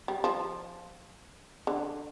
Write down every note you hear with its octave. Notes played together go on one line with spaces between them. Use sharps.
G3
F3
D3